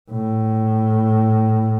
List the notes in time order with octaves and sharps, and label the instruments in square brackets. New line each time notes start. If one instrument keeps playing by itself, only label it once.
[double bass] A2